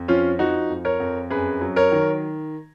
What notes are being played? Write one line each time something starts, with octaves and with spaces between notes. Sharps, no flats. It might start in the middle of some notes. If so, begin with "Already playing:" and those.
Already playing: F2
F3 C#4 F4
F3 D#4 F#4
F2
A#4 C#5
F2
F#2 G#4 B4
F#3
A#4 C#5
D#3